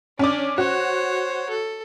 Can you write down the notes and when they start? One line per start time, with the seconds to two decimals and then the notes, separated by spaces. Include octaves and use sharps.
0.19 C#4 D4 D6
0.58 F#4 C5 C#5
1.50 A4